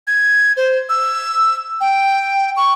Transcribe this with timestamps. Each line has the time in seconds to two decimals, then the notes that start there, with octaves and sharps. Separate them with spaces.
0.07 G#6
0.57 C5
0.89 E6
1.81 G5
2.57 C#6